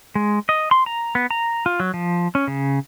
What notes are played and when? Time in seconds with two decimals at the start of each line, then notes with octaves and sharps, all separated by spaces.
0.15 G#3
0.49 D#5
0.71 C6
0.86 A#5
1.15 B3
1.31 A#5
1.66 F4
1.80 F#3
1.94 F3
2.35 C#4
2.48 C#3